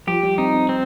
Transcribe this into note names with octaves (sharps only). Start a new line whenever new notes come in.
F3 G4
G3
C4 D#4
C4
C4